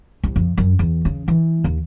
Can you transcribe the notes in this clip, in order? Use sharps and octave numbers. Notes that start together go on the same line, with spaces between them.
C2
F2
F#2
E2
C#3
E3
D#2